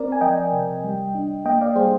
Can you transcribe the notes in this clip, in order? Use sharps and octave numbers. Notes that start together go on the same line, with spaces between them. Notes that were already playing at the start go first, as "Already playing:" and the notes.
Already playing: C4 A#4 D5
G#5
F3 D#5 G5
C3
G3
D4
A#3 D#5 G5
D5 F5
G3 G#4 C5